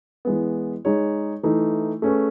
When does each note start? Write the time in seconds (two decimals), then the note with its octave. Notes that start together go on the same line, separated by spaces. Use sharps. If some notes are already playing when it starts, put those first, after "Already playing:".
0.25 E3 G#3 B3
0.85 G#3 D#4 G#4 C#5
1.43 E3 A3 D#4
2.02 A3 C#4 G#4 B4